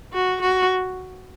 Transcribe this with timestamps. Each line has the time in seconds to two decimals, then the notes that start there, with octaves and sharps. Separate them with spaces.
0.13 F#4
0.41 F#4